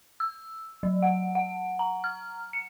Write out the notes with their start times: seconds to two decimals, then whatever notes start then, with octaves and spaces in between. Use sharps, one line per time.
0.20 E6
0.83 F#3
1.02 F#5
1.35 F#5
1.79 A#5
2.04 F6
2.53 C#7